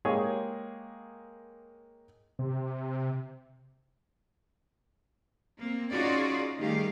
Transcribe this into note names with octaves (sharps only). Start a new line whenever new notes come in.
G#3 A#3 G4 G#4 C#5
C3
A#3 C4
C#4 D#4 F4 F#4 G#4 D5
D#3 G3 A3 G4 G#4 F5